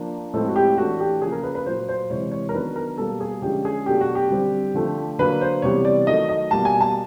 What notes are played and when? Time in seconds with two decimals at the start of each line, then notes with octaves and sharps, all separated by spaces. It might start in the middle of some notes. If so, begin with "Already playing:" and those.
Already playing: F3 A#3 D4
0.33 A2 F3 G#3 C4 A4
0.48 F#4
0.56 G4
0.77 E3 A3 D4 F#4
1.00 G4
1.21 C#3 F3 A#3 G#4
1.32 A#4
1.43 B4
1.55 B4
1.65 A#2 F#3 A#3 C5
1.88 C5
2.10 C3 E3 G#3 C#5
2.31 C#5
2.49 A#4
2.53 D#3 F#3 B3 D4 B4
2.76 A#4
2.98 B2 G3 A#3 A4
3.21 G#4
3.42 D3 F3 G#3 C#4 G4
3.65 G#4
3.86 B2 F#3 A3 D4 G4
4.01 F#4
4.15 G4
4.30 D3 G3 C4
4.74 D3 F3 A3
5.19 D3 F#3 A#3 B4
5.41 C5
5.62 C3 E3 G3 B3 C#5
5.85 D5
6.07 D#3 F#3 A3 D#5
6.29 D#5
6.51 B2 G3 A#3 A5
6.65 G#5
6.81 A5